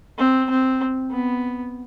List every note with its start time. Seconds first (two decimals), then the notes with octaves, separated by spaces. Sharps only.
0.18 C4
0.50 C4
1.12 B3